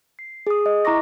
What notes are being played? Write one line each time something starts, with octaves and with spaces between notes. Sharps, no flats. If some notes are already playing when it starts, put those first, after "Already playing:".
C7
G#4 D#6
D#5
E4 A#5 C#6 D6 A#6